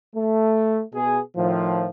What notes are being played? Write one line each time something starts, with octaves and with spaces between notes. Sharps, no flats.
A3
B2 B3 G#4
A2 D#3 F3